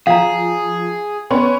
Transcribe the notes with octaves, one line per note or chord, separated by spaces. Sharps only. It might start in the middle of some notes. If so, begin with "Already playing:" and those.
F3 G#4 F5 A#5
B3 C#4 C#5 C6